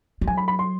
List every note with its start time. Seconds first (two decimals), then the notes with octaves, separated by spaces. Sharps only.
0.21 G3
0.27 F#3 G#5
0.37 B5
0.48 B5
0.59 C6